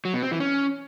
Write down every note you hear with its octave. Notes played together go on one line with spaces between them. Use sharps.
F#3
B2
C4
E3
C#4